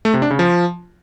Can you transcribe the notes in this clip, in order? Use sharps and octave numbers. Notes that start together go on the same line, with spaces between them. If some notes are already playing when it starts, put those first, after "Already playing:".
A3
C3
D4
C#3
F3